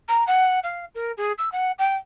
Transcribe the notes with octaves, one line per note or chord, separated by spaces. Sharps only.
A#5
F#5
F5
A#4
G#4
E6
F#5
G5